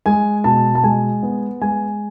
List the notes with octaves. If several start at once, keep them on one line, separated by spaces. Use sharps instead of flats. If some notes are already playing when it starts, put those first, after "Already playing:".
G#3 G#5
B2 A5
A5
G#3 G#5
B3
G#3 G#5